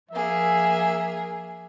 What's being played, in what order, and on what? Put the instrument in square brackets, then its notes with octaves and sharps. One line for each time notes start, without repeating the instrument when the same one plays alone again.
[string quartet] F3 A#3 G#4 [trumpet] E5